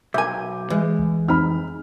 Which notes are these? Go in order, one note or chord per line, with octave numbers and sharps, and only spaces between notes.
B1 A#4 E5 G#5 D6 G6
E3 G#3
C#2
F2 C4 D#4 B5 F6